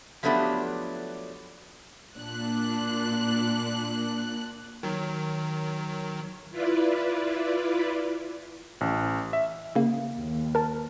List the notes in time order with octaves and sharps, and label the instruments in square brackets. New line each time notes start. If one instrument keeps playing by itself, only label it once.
[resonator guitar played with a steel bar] F3 F#3 A3 B3 D4 G4
[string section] A#2 D4 F#6
[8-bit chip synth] D#3 F#3
[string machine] E4 F4 B4 D5
[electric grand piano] A1
E5
[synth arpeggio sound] C#3 A#3
[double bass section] D#2
[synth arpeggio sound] A#4 A5